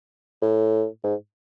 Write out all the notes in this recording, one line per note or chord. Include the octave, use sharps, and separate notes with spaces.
A2
G#2